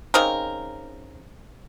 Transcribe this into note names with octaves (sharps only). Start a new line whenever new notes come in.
C#3 C4 D#4 A#4